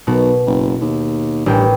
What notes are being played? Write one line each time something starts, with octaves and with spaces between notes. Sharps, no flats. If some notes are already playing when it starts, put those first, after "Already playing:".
B1 B2
F#1
D#2
A1 G2 G5